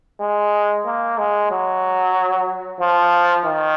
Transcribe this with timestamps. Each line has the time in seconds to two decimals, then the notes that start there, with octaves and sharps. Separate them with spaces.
0.20 G#3
0.86 A#3
1.18 G#3
1.51 F#3
2.80 F3
3.46 D#3